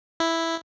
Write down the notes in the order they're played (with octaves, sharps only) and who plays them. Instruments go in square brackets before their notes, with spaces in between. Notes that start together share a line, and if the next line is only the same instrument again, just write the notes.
[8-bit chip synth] E4